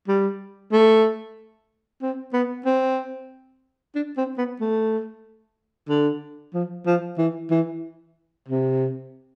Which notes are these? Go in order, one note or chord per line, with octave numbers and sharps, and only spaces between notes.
G3
A3
C4
B3
C4
D4
C4
B3
A3
D3
F3
F3
E3
E3
C3